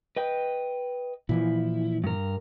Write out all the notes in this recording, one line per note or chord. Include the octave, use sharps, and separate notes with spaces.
B4 D#5 G5
A#2 E3 F3 E4
G2 A#4